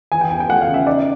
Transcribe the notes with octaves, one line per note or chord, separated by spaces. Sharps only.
E3 G#5
G5
E2 G#5
G5
A3 F#5
F5
C#3
E5
D#4 D5